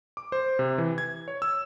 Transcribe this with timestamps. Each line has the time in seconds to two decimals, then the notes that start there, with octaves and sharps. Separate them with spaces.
0.17 D6
0.32 C5
0.59 C3
0.78 E3
0.98 G#6
1.28 C#5
1.42 E6